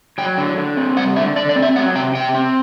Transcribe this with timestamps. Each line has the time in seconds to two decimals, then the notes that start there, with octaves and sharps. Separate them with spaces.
0.18 F#3 G5
0.37 D3
0.57 D3
0.77 C4
0.97 G3 F#5
1.16 D3 E5
1.36 D3 D5
1.49 D5
1.56 C4
1.62 E5
1.76 F#3 F#5
1.95 C3 G5
2.15 C3 G5
2.34 C4